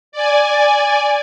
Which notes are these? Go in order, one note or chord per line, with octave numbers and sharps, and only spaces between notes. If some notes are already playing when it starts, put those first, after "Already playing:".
D5 G#5